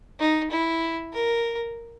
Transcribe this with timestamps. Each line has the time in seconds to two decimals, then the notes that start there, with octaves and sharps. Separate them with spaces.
0.19 D#4
0.50 E4
1.13 A#4